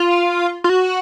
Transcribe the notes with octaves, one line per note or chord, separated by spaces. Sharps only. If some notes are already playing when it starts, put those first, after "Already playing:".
Already playing: F4
F4
F#4